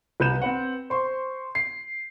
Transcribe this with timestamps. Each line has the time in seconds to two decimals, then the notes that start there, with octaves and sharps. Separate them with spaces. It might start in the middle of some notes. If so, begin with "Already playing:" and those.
0.20 C2 B4 G6 E7
0.42 C4 B4 F#5
0.90 C5 C6 C#6
1.55 C7